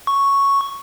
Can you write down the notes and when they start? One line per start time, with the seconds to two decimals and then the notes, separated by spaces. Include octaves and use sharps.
0.07 C#6